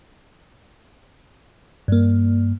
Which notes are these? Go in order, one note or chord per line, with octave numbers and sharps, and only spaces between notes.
G2 A#3